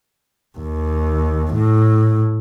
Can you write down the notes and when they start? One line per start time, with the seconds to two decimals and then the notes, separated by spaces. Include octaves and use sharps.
0.58 D#2
1.53 A2